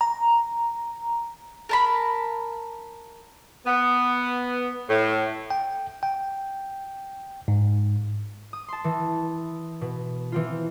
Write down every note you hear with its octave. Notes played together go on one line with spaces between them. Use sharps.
A#5
A#4 A5 B5
B3
A2
G5
G5
G#2
D#6
A5 C6
E3
B2
E3 C4 F4